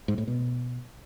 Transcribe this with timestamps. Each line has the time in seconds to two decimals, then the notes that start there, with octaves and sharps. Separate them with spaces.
0.08 G#2
0.18 A2
0.27 B2